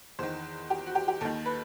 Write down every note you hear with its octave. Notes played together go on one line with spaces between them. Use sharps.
E2 D#3 C5
G4
F#4
G4
G4
D#2 D#3 A4
B4